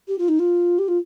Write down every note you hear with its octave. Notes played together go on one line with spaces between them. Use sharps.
G4
F4
D#4
F4
G4
F4